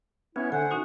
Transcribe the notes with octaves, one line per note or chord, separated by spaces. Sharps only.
B3 C#4 E4 C#5
D3 A3 C5 F#5 G#5
C#4 D#4 F#4